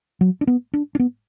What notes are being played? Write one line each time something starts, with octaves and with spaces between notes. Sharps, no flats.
F#3
D4
B3
D4
D4
B3